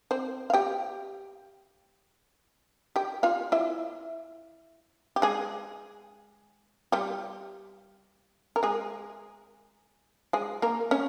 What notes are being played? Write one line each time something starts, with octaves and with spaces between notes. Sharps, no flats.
C4 C5
F5
G4 G5
G4 G5
F4 F5
E4 E5
G4
G#3 G#4
G3 G4
A#4
G#3 G#4
G#3 G#4
A#3 A#4
C#4 C#5